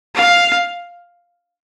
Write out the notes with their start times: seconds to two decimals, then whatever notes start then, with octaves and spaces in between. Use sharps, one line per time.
0.15 F5